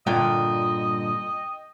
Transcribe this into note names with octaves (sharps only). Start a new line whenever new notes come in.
G2 A#2 D3 D#5 G5